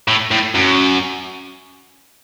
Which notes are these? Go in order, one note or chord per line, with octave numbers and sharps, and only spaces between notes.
A2
A2
F#2